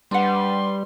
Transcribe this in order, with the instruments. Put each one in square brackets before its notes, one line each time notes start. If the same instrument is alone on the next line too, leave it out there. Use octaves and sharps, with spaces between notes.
[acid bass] G3 [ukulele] D4 F#5 [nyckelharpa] B4 [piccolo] C6